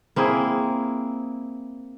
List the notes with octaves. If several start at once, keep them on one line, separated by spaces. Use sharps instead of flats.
A#3 C4 E4 G#4